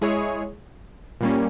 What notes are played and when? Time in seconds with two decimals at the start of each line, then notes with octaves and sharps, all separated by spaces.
0.01 G#3 E4 G#4 C#5
1.21 A#2 G3 A#3 C#4